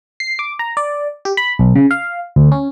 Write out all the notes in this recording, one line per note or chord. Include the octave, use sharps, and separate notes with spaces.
C7
D6
A#5
D5
G4
B5
B1
C#3
F5
D2
C#4